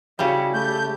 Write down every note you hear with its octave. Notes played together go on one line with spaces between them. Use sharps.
C#3 G3 E4 F#4
A3 G4 G6